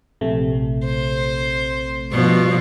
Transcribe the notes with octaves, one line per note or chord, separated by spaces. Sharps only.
A#1 C3 A3
C5
G2 B2 F3